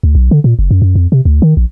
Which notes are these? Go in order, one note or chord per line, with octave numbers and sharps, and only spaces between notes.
D2
B1
D3
A#2
F#1
F#2
F#2
F2
C3
D2
D#3
A#1